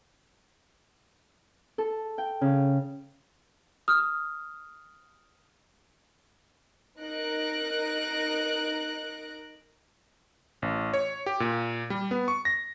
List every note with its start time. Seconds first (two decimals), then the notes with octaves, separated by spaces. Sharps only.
1.78 A4
2.18 G5
2.41 C#3
3.88 D#6 F6
6.99 D#4 A#4 F#6 A#6 D7
10.62 A1
10.94 C#5
11.26 G4
11.40 A#2
11.90 G3
12.11 B3
12.28 C#6
12.45 A#6